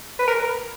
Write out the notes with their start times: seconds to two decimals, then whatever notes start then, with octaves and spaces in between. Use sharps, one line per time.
0.19 B4
0.27 A#4